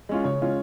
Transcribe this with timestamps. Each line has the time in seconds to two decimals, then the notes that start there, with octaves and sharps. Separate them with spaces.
0.09 G#3 C#4 F4
0.24 C#3 C#5
0.41 G#3 C#4 F4